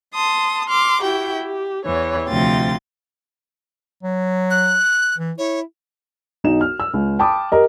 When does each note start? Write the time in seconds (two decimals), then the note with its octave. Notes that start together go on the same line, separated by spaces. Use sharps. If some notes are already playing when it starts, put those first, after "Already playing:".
0.13 A5 C6 D#6
0.68 C6 D6 F6
1.02 E4 F#4 G4 G5
1.43 G4
1.86 E2 E3 C#5
2.28 D2 C3 F3 F4 G5 A6
4.03 F#3
4.50 F#6
5.18 E3
5.38 E4 C#5
6.44 B1 D#4 E7
6.61 F6
6.80 E6
6.94 C#2
7.19 G5 A5 B5 D6 D#6
7.52 G4 A#4 D#5